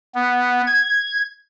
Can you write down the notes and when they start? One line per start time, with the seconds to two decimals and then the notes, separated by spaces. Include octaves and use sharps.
0.15 B3
0.67 G#6